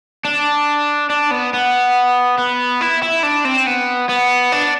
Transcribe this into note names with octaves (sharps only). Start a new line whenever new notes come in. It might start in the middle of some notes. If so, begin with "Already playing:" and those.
D4
D4
B3
B3
B3
E4
E4
D4
C4
B3
B3
D4